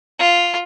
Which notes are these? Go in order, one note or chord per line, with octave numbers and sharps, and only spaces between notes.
F4